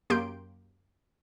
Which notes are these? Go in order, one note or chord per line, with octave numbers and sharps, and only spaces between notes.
F#2 A#3 G4 C6 G6 D7